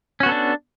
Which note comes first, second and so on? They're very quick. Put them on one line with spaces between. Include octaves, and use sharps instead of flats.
C#4 F#4 B3 A4 D4